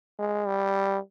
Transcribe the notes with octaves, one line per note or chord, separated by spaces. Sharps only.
G#3
G3